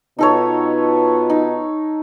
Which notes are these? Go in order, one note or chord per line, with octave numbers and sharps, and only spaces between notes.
B2 B3 D#4 F4 A4 C#5
D#4